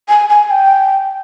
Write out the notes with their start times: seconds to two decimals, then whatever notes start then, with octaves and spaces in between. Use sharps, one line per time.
0.09 G#5
0.29 G#5
0.51 G5